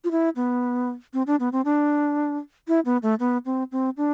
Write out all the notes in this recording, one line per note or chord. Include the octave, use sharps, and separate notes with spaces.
F4
E4
B3
C4
D4
B3
C4
D4
E4
B3
A3
B3
C4
C4
D4